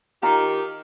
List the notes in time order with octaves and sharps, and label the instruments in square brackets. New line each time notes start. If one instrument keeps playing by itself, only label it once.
[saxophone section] D#3 G4 [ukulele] F4 A#5